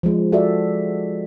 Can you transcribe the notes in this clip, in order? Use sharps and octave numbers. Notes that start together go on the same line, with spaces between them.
F3 G#3
F#4 A4 D5 E5